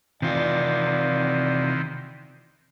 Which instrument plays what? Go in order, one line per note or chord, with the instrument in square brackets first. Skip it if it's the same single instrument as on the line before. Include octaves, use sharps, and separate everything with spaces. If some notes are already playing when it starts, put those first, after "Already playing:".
[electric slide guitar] C3 F4 [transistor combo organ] D#3 E3 C4 [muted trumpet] D5